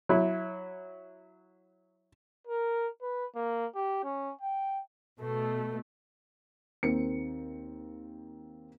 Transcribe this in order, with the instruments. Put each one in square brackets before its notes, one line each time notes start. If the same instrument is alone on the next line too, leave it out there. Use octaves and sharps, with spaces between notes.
[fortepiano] F#3 E4
[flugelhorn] A#4
B4
A#3
G4
C#4
G5
[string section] B2 A3
[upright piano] D#2 C4 A#4 C#7